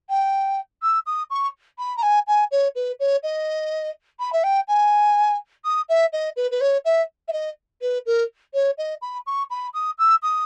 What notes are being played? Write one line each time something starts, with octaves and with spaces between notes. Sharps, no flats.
G5
E6
D#6
C#6
B5
A#5
G#5
G#5
C#5
B4
C#5
D#5
B5
E5
G5
G#5
D#6
E5
D#5
B4
B4
C#5
E5
E5
D#5
B4
A#4
C#5
D#5
B5
C#6
B5
D#6
E6
D#6